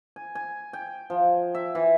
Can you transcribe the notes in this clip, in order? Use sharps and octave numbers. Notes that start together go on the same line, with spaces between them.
G#5
G#5
G5
F3
E5
E3